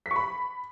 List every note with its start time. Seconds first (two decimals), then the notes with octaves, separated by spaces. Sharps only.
0.06 B6
0.11 C#6
0.16 B5